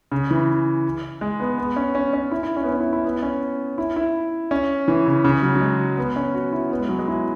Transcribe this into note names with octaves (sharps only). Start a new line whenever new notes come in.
C#3
E3
G#3
B3
B3
C#4
C#4
C#4
E4
E4
C#4
B3
C#4
E4
E4
B3
C#4
E4
E4
C#4
E3
C#3
C#3
F#3
F#3
G#3
B3
C#4
F#4
E4
B3
G#3
F#3
G#3
E4